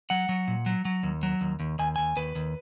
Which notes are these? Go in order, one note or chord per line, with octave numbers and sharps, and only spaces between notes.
F#3 F#5
F#3
A#2
F#3
F#3
D#2
F#3
D#2
D#2
D#2 G#5
D#2 G#5
D#2 B4
D#2